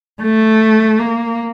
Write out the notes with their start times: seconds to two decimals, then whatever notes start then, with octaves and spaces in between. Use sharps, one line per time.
0.22 A3
0.99 A#3